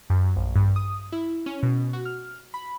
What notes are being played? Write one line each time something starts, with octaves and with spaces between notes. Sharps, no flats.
F#2
A#1
G2
D#6
E4
C#4
B2
F#4
F6
B5